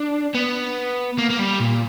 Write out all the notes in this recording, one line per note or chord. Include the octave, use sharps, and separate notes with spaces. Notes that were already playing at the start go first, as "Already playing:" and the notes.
Already playing: D4
B3
A#3
A#3
G3
A#2